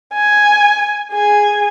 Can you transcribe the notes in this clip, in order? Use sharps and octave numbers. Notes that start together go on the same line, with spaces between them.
G#5
G#4 G#5